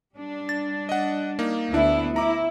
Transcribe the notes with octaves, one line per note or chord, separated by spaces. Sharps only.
G3 D4
A6
D#5 F#5
A#3 D#4
D2 B3 D4 E4
E4 A#5 D6